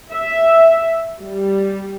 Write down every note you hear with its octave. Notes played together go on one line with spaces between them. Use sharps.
E5
G3